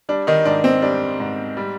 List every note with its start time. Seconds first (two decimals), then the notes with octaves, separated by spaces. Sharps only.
0.09 G3 D4
0.27 D#3 D#4
0.45 G#2 D4
0.64 C4
0.82 G3 D4
1.20 G#2
1.57 G3